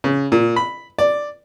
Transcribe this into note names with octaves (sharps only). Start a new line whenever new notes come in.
C#3
A#2
B5
D5